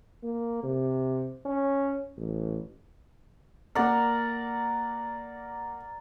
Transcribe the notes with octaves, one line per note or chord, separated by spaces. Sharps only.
A#3
C3
C#4
A1
A#3 A#4 D5 F#5